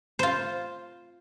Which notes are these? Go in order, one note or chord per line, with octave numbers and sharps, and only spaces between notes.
F4 C5